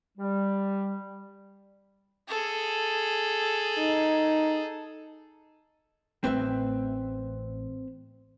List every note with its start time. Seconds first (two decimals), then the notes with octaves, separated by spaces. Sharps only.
0.18 G3
2.28 G#4 A4
3.78 D#4
6.24 A1 A2 C4 B4 E5